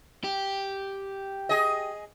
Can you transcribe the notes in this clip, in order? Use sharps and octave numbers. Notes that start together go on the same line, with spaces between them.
G4
G#4 D#5